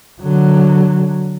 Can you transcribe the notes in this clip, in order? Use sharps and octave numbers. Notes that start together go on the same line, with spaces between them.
D3 F#3